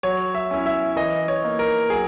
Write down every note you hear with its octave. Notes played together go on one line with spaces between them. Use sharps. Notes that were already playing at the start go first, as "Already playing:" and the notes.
F#3 C#5
E5
C#4 E4
E5
E3 D#5
C#5
A#3 D#4
A#4
F#3 G#4